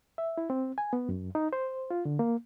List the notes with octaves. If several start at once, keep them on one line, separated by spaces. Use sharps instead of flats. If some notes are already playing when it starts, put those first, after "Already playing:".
E5
E4
C4
G#5
B3
F#2
D#4
C5
F4
D3
A#3